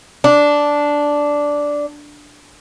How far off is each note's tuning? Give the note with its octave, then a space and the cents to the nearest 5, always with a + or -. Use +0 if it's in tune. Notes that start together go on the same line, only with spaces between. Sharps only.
D4 -5